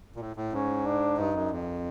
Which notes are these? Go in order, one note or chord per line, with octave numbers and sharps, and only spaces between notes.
A#2
A2
A2
G#2 C#4
D4
G2 D#4
F#2
F2